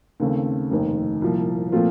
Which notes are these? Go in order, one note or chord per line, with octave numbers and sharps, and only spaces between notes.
D#2 C#3 A3 C4
F1 D#2 D#3
C2 A#2 F3
A#2 F3 A3 C4 F4